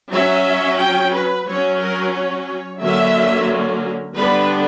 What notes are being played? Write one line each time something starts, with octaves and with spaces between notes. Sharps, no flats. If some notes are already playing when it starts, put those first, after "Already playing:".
F#3 C#4 E5
G5
B4
F#3 C#4 C#5
A#4
C#5
D3 F#3 A#3 C#4 E5
D3 G3 B3 D4 B4